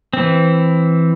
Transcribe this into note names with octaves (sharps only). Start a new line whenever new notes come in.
E3 C4